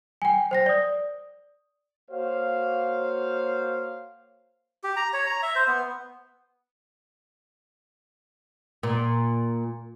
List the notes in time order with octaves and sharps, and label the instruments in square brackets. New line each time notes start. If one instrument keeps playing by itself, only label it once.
[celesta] G5 G#5
C5 G5 A#6
D5 D#6
[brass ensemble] A#3 F#4 C5 C#5 F5
[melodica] G4
A#5
C#5
A#5
E5
C5
B3
[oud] A#2